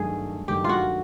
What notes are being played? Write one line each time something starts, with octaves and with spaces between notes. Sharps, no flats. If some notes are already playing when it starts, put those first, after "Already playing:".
Already playing: G2 D#3 F#3 A3 G#4
G2 D#3 F#3 A3 G4
F4 F#4